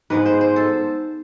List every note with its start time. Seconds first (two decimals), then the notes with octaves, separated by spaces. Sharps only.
0.10 G#2 G#3 B3 B4
0.26 C5
0.41 C5
0.56 A4